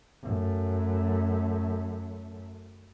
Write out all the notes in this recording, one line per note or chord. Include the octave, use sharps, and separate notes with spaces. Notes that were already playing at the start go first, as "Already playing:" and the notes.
F#2 A3